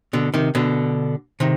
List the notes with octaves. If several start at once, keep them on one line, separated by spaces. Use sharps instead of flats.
B2 D3
C3 D#3
B2 D3
C3 D#3